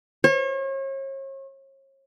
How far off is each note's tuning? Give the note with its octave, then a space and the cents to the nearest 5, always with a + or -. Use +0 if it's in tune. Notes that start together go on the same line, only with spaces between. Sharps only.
C#5 -40